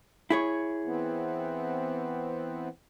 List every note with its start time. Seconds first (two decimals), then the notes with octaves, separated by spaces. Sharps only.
0.30 E4 G#4 C#5
0.85 E3 B3 C4